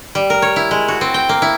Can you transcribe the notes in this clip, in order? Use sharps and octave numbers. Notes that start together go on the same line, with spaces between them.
G3
A#4
C#5
E4
G#3
F#4
C4
G5
A#3
E4